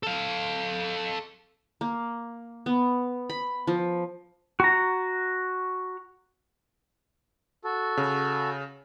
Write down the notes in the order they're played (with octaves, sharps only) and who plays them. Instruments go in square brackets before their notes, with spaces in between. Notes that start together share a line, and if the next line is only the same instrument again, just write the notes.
[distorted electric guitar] A4 F5
[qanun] A#3
B3
B5
F3
[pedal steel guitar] F#4 A#5
[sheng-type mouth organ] F#4 A4
[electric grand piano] C#3